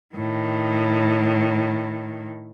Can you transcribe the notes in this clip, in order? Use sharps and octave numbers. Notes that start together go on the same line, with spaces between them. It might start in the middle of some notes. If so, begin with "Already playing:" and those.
A2 D#3